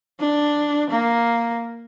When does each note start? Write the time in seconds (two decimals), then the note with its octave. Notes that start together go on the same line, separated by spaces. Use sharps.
0.20 D4
0.91 A#3